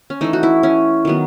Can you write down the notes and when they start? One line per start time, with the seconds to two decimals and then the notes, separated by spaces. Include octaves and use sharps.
0.10 C#4
0.21 E3 A3 D#4
0.33 F#4
0.43 E4
0.63 C#4
1.05 D#3 F#3 B3